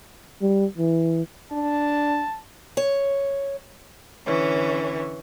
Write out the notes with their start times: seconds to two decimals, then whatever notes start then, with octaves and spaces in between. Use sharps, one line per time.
0.42 G3
0.78 E3
1.52 D4 A5
2.77 C#5
4.26 D3 E3 C#4 C#5